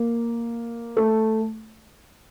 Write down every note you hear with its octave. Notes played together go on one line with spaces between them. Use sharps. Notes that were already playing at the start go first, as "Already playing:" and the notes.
Already playing: A#3
A3